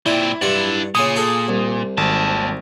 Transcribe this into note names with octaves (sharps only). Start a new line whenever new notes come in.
A#2 C4 E4 D5
G2 D4 F4 F#5
A#2 C#3 G#5 B5 D#6
F4 G#4 A4
C2
G#1 D#2 A5